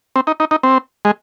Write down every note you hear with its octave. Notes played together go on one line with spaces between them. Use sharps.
C4
D#4
D#4
D#4
C4
G#3